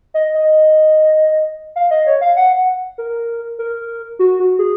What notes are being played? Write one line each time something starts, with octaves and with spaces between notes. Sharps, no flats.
D#5
D#5
F5
D#5
C#5
F5
F#5
F#5
A#4
A#4
F#4
F#4
G#4